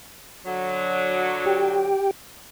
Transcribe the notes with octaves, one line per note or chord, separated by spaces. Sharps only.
D3 F#3
G4 G5